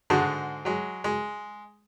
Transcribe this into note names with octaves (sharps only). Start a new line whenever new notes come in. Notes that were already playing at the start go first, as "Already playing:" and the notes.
G#2 D3 G#3 F#4 A5
F#3 G#3
G#3